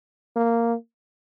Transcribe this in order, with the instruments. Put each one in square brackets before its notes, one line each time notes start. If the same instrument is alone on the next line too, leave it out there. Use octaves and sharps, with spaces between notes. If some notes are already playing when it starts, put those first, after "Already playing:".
[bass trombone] A#3